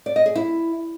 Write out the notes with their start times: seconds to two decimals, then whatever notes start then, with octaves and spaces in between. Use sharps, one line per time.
0.06 D5
0.16 D#5
0.26 G#4
0.36 E4